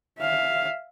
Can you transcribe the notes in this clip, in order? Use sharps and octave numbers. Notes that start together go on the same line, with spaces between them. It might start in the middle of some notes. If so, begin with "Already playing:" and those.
E5 F5